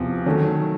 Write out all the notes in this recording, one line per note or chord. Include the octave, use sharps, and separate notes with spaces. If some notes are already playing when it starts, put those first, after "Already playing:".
Already playing: E2 C3 F3
D#3 F#3 A3 C#4